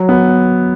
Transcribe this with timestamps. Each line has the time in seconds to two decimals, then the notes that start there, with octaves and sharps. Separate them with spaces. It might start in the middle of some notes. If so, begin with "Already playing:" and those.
Already playing: F#3
0.09 B3